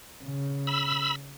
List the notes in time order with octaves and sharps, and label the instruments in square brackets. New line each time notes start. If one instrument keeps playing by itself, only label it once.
[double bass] C#3
[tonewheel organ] B5 E6